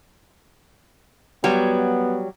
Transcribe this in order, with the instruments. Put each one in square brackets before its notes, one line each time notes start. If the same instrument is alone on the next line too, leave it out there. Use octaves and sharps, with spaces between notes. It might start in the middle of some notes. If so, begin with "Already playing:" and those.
[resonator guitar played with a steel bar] F#3 G3 [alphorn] B3